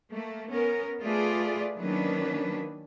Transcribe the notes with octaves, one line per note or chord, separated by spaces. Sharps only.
A3 A#3
B3 C#4 A#4
A3 F4 G#4 B4 D5
D#3 F#3 A#3 C#4 D4 B4